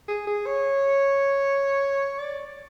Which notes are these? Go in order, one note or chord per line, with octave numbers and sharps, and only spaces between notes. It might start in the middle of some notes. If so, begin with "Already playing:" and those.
G#4
G#4
C#5
D5